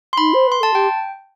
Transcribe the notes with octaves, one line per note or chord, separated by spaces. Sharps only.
C6
D#4 B5
C5
B4
C6
A4 A5
G4 G5